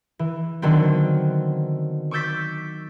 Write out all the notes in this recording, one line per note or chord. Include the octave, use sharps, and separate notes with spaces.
E3
D3 D#3 F#3 B3 C4
C#6 D6 E6 G6 A6 B6